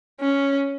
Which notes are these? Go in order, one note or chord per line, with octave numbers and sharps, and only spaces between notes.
C#4